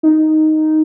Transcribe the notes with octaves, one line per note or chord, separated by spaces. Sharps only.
D#4